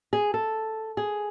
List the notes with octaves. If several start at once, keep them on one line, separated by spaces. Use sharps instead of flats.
G#4
A4
G#4